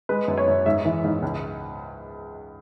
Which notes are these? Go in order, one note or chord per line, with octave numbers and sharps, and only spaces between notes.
G#3 B4
F#2
C#5
F#2
G#2 E5
E3
G#2
C#2